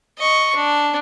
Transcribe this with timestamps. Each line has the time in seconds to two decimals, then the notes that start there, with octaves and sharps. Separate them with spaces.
0.18 D#5 C#6
0.55 D4